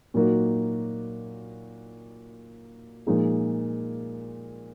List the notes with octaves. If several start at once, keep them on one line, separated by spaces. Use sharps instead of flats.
A#2 F#3 A#3 D#4 F#4
A#2 F3 G#3 D#4 G#4